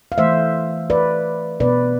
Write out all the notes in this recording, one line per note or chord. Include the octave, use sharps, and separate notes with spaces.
F5
E3 A3 C5 E5
B4 D5
B2 B3 B4 D5